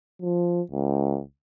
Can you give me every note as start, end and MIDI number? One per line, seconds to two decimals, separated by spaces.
0.22 0.61 53
0.71 1.21 37